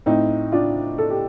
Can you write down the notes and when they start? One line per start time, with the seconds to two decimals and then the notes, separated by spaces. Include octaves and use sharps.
0.06 A2 C4 D#4
0.52 D4 F4
0.98 A4
1.10 G4